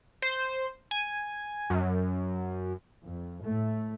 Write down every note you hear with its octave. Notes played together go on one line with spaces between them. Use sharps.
C5
G#5
F#2
F2
A2 A3